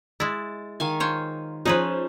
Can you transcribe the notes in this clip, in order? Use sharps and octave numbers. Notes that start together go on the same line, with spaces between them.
G#3 E4 A6
D#3 F5 G#5
F4 C5 C#5
F3 C#4 D#4 G#4 B4 C5